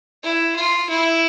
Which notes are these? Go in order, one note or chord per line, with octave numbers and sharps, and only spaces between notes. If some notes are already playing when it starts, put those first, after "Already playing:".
E4
F4
E4